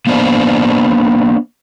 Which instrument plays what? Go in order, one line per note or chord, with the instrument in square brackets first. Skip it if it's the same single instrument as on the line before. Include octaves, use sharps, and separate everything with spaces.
[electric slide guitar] A#3 B3 D4 C5 D5